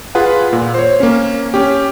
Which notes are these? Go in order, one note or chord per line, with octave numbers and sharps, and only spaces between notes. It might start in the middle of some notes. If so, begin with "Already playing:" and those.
F4 G#4 B4 F#5
A#2
C5 C#5
A#3 C#4
C#4 G4